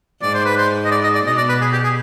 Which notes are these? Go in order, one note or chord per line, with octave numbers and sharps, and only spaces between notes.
G#2 D5
C5
B4
C5
D#5
D5
D#5
D5
B2 D#5
D5
B4
G#4
G4
G#4